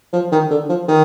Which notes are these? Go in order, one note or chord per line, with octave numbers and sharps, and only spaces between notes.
F3
D#3
D3
F3
D#3